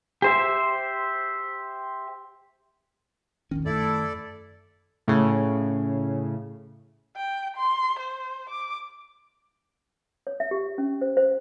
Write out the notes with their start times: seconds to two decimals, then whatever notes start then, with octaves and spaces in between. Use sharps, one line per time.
0.22 G4 C5 E5
3.51 D#1 A#1 D#3 C#4
3.66 F#2 A3 E4 A4 D5
5.08 A2 C#3
7.17 G5
7.57 C6
7.99 C5
8.49 D6
10.27 C#5
10.40 E5
10.51 G4
10.78 C#4
11.01 C5
11.17 C5